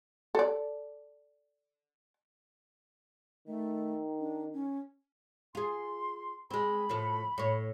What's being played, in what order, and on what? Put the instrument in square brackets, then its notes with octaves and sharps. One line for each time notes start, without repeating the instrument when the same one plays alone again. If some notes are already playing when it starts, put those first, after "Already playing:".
[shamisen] A4 D5
[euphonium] D#3 [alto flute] A3
[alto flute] D4
C#4
[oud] F4 G#4 [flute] C6
[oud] G#3 C4 [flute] B5
[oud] A2 F3 A4
A2 C#5